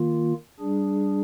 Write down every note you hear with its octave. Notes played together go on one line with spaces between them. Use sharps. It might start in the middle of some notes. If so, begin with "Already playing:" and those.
Already playing: D#3 A#3 F4
G3 D4 G#4